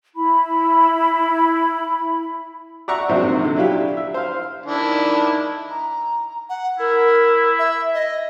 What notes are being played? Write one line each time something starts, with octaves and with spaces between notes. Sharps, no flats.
E4 B5
D5 E5 F#5 A#5 C#6
A#1 G#2 C3 F#3 C5
D3
F#3 D4 E4 F4 G4
E5
C5 F5
D#3 D4 E4
A#5
F#5
E4 A#4
E5
D#5